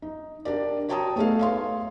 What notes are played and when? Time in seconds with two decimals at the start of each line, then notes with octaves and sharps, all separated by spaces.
0.02 D#4
0.45 D4 G4 A#4 D5
0.88 F#4 C#5 G5 A5 A#5 D#6
1.16 A3 B3 D#4 G#4 A4 F5
1.39 C#5 F5 C6